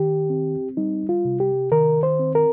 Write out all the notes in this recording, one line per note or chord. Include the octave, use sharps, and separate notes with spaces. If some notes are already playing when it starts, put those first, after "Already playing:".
Already playing: D#3 G4
C4
G3 D#4
F4
C3
G4
D#3 A#4
C5
C4
A#4